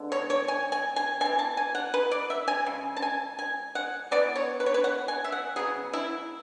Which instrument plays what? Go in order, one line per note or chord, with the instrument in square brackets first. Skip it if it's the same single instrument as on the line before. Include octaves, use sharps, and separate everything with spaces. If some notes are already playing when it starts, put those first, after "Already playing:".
Already playing: [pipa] D3 G#3 B3
C#5
C#5
G#5
G#5
G#5
B3 G#5
E3
A5
G#5
F#5
B4
D5
E5
G#5
C#3 G#3
A5
G#5
G#5
F#5
E3 B3 D5
C#5
B4
C#5
B4
F#5
G#5
E5
F#5
C#3 F#3 B3 G#4
E4